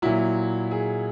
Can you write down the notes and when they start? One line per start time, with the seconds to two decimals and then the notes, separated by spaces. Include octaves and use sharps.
0.02 A#2 F#3 E4
0.71 G#4